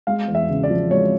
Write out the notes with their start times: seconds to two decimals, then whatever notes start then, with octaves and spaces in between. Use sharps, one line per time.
0.07 G#3 F5
0.28 E2
0.35 E5
0.49 C#3
0.63 D5
0.70 F3
0.91 G#3 C#5